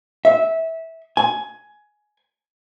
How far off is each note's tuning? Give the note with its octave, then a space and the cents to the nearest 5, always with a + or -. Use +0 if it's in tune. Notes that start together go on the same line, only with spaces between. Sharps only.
E5 -15
G#5 +15